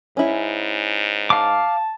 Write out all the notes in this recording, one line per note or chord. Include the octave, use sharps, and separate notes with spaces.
G#2 C#4 E4
F5 A5 D6